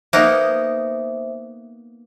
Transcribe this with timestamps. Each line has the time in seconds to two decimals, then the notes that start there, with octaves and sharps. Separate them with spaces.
0.13 A#3 B3 D#4 C5 E5